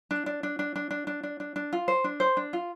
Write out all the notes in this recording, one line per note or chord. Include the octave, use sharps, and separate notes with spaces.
D4
D4
D4
D4
D4
D4
D4
D4
D4
D4
F4
C5
D4
C5
D4
F4